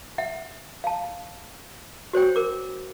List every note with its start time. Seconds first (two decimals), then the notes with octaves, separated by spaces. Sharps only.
0.18 E5 F#5
0.84 F5 A5
2.13 F#4 C5 C#5 G5
2.36 A#4 D6